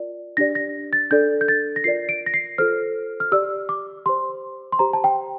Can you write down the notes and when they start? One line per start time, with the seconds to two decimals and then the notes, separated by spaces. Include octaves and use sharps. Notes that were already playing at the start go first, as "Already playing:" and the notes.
Already playing: F4 A#4 D5
0.37 D4 G4 D5 A#6
0.55 A#6
0.93 A6
1.11 D4 A4 D5 G6
1.41 G6
1.48 A6
1.76 A#6
1.84 F4 A#4 D5 C7
2.09 D7
2.26 A#6
2.34 C7
2.58 F4 A4 C5 F6
3.20 F6
3.32 G4 D5 E6
3.69 D6
4.06 G4 C5 C6
4.72 C6
4.79 G4 C5 A#5
4.93 A5
5.04 G5